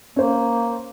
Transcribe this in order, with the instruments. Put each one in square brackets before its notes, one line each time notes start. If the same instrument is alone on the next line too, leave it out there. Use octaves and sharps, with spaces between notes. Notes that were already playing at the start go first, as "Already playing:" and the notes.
[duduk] A#3 [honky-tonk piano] C#4 C5